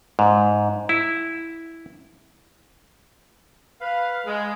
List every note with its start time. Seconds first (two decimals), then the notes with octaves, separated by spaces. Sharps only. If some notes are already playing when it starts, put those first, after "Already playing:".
0.19 G#2
0.89 E4
3.81 B4 F5
4.25 G#3